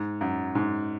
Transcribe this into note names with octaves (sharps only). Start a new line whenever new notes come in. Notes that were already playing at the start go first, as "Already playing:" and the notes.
Already playing: G#2
F#2
G#2